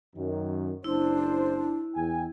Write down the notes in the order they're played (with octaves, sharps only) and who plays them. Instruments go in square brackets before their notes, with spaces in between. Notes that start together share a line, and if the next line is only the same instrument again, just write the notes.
[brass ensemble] F#2 D#3
[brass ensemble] F#1 C5 [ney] D4 [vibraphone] E4
[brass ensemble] E2 G5 G#5